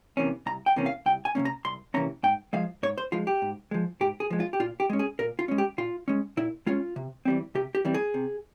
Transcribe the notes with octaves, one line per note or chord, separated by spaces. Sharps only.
C3 E3 A#3 C#4
C2 A#5
G5
C3 E3 A#3 C#4
F5
C2 G5
G#5
C3 E3 A#3 C#4
A#5
C2 C6
C3 E3 A#3 C#4 A#5
G#2 G5
F3 G#3 F5
G#2 C#5
C5
F3 G#3 F4
G4
G#2
F3 G#3
G#2 G4
G#4
F3 G#3
F4
G4
A#2 F4
G4
G#3 C#4
G#4
A#2 A#4
F4
G#3 C#4
G4
A#2 F4
G#3 C#4
A#2 E4
G#3 C#4 F4
C3
E3 G3 C4
C3 G4
G4
E3 G3 C4
G#4
C3